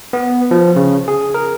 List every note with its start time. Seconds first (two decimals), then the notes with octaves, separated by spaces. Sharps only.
0.13 B3
0.51 F3
0.76 C#3
1.08 G#4
1.34 A#4